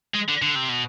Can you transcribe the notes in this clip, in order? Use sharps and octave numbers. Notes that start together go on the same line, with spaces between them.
G#3
D3
D3
C3
B2